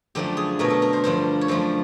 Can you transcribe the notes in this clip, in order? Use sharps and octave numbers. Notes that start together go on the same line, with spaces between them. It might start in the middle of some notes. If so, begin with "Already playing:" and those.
F#2 D3 F3 A3 G4
G#4
B2 F#3 A3 A#4
A4
A#4
C5
G2 D3 F3 C5
C#5
F#2 D3 F3 A3 C5